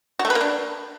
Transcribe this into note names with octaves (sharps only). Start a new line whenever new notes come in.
F#4
A3
B4
A#3
D4